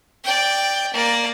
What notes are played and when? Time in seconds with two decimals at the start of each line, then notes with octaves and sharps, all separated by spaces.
0.24 D5 G5
0.94 A#3 D5